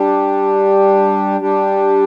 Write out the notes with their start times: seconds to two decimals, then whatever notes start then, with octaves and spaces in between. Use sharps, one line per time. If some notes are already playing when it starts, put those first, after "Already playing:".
Already playing: G3 D4 G4
1.40 G3 D4 G4